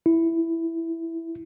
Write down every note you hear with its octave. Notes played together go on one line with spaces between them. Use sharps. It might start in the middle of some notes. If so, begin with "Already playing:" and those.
E4